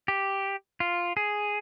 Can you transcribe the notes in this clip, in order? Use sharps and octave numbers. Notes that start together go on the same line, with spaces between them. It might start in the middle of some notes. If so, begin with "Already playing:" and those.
G4
F4
G#4